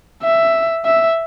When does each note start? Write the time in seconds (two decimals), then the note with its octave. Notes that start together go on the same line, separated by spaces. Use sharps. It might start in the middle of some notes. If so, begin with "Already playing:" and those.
0.23 E5
0.85 E5